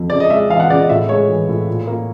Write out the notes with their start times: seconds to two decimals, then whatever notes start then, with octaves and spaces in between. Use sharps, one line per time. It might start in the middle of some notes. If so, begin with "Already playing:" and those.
Already playing: F2
0.10 C#3 D5
0.20 D#5
0.30 G#3 E5
0.50 E3 F5
0.60 F#5
0.69 C#3 D5
0.79 D#5
0.89 A2 E5
1.09 G#3 C#5
1.29 E3
1.49 A2
1.68 A#2
1.87 A#3